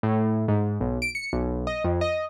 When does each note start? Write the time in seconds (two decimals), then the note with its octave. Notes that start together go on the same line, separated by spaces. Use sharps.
0.03 A2
0.48 G#2
0.80 B1
1.02 D7
1.15 C#7
1.33 B1
1.67 D#5
1.84 F2
2.01 D#5